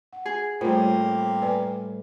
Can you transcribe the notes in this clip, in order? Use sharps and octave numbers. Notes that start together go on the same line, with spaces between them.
F#5
G#4
A2 G3 A#3 C4 F4 G4 A#4 C5
B4 D5 G#5